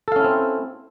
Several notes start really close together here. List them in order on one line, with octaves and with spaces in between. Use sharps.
A4 F5 C#4 E4 C4